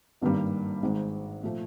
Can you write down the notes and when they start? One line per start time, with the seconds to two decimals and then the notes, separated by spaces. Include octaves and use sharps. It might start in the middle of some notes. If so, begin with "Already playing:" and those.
0.21 G#1 G2 D#3 G3 A#3
0.83 G#1 G#2 D#3 G#3
1.43 A#2 F3 A3